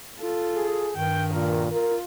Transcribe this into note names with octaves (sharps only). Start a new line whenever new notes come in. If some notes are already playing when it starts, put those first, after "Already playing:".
F4 A4
G#4
G2 D#3 G5
A#2 A#4
F4 A#4